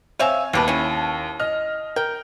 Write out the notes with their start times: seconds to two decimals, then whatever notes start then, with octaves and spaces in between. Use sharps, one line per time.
0.19 C4 C#5 E5 F5 G#5
0.53 D#2 B2 G4 B4 A5
0.68 C#4 E4
1.40 D#5 F6
1.96 A#4 G5